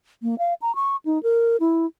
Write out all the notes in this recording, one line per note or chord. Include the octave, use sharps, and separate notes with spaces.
A#3
F5
A#5
C#6
D#4
A#4
E4